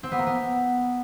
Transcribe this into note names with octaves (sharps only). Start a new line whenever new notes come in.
C4
B3
A#3
B3